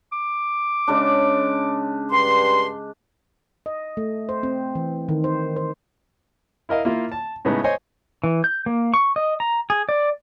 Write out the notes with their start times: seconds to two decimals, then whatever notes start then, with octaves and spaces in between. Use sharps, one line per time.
0.12 D6
0.87 C#3 G#3 D4
2.11 G2 C6
3.66 D#5
3.97 A3
4.29 C5
4.43 C4
4.75 E3
5.09 D#3
5.24 C5
5.56 C5
6.69 E4 A#4 D#5 F5
6.85 A#3 E4 F4
7.12 A5
7.45 A2 C#3 G#3 B3 D#4
7.64 C5 C#5 D#5 G#5
8.24 E3
8.44 G6
8.66 A#3
8.94 C#6
9.16 D#5
9.40 A#5
9.70 G#4
9.89 D5